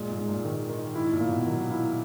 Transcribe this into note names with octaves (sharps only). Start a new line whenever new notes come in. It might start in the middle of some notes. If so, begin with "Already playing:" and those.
Already playing: A#2 G#3
G#2
G#3
A#2
D#3
D#3
G#2 E4
A#2
A#3
B2
D#3 F#3
E4